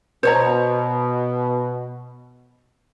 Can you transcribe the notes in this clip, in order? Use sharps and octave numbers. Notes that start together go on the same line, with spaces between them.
B2 C5 C#5 A#5